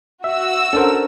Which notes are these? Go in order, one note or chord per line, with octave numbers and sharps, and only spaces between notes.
F#4 E5 E6
C#4 D4 A4 A#4 C5